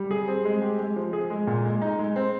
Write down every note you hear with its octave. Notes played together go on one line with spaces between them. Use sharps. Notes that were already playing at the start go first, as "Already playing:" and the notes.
Already playing: G3
G#4
C4
G#3
G4
G#3
F3
G#4
G#3
A#2
G#3
D#4
G#3
C4